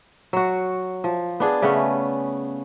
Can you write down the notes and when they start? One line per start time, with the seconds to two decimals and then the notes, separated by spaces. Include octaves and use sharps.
0.33 F#3 F#4
1.04 F3
1.40 B3 D4 G#4
1.62 C#3 A3 B3 C#4